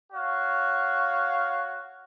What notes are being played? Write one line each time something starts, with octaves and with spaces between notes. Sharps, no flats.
F#4 C#5 F5